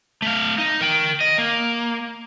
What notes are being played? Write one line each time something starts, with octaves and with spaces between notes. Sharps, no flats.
A3 F5
D#4
A#4 G5
D#5
A#3